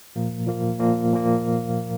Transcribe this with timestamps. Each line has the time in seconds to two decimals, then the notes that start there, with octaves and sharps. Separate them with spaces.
0.16 A#2 F3 A#3
0.47 A#2 F3 A#3
0.79 A#2 F3 A#3
1.12 A#2 F3 A#3